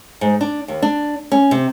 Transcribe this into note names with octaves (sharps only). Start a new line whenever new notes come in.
G#2
D4
D#2
D4
C#4
C3